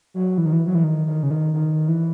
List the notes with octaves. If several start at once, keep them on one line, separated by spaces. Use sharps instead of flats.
F#3
E3
D#3
E3
F#3
E3
D#3
D#3
C#3
D#3
D#3
E3